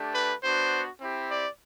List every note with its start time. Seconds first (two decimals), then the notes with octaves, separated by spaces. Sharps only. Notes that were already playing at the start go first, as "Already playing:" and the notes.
Already playing: A3 D4 G4
0.15 B4
0.43 B3 D4 F#4 C5
0.99 C4 E4 G4
1.29 D5